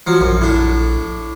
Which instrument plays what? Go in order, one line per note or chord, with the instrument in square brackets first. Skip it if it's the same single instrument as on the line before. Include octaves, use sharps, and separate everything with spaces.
[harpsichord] F3 F#3
[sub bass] A#1 [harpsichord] F#2
[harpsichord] A2 D4